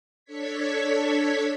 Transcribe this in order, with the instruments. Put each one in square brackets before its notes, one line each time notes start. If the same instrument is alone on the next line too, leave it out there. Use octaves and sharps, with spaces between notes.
[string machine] D4 A4 C#5 C#6 G#6 B6